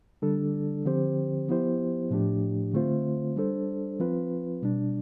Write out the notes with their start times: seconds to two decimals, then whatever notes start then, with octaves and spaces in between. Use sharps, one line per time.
0.22 D3 G3 D4 A4
0.85 D3 F3 C4 G4 C5
1.48 F3 B3 E4 G4 C5
2.10 A2 F3 A3 D4 G4
2.73 D3 A3 C4 F4 C5
3.36 G3 D4 A4 C5
3.99 F3 C4 F4 B4
4.62 B2 G3 D4